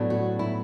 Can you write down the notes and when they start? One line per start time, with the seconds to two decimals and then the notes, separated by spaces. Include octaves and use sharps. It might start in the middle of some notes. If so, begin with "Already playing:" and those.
Already playing: A2 F#3 B3 D4
0.10 F#4
0.39 E4